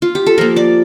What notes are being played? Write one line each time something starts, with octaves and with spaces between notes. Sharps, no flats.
F4
G4
A4
F3 A#3 A#4
D5